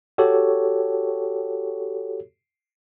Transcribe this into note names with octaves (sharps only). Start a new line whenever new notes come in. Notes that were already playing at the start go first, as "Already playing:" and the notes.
F#4 G4 A4 C#5